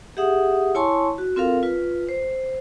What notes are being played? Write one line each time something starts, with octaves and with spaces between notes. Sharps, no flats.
G4 G#4 E5 F#5 D#6
E4 C#5 G#5 A5 C6 C#6
F#4
C4 F4 A4 A#4 F5
F4 B4
C5